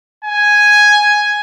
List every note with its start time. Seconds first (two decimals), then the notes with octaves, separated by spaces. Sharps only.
0.25 G#5